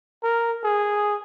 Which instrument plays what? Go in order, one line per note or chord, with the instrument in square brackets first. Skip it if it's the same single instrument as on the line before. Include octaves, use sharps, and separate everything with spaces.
[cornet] A#4
G#4